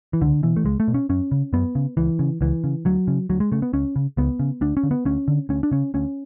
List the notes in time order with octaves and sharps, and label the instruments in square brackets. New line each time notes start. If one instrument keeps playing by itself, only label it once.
[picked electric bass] E3
C#2 D3
B2 E3
A3
C#2 G#3
A3
B2
C#4
F#2 C#4
C#3
F#2 B3
C#3
C#2 E3
C#3
C#2 E3
C#3
D2 F#3
C#3
D2 F#3
G#3
C#3 A3
B3
C#2 C#4
C#3
C#2 B3
C#3
D2 D4
C#4
D3
B3
D2 C#4
D3
D2 C#4
D4
C#3 C#4
D2 C#4